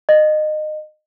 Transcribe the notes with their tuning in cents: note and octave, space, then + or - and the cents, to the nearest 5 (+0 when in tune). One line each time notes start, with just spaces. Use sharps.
D#5 -25